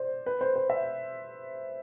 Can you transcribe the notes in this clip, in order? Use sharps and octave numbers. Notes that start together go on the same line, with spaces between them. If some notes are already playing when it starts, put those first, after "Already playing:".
Already playing: C5 D5
B4
C5
C5
E5